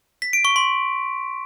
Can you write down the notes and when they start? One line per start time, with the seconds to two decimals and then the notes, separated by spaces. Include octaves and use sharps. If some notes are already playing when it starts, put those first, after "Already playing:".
0.22 B6
0.33 D7
0.45 C#6
0.56 C6